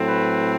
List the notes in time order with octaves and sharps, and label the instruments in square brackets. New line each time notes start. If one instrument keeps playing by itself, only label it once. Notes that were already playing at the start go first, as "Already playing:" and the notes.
Already playing: [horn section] A2 F#3 A3 C4
B4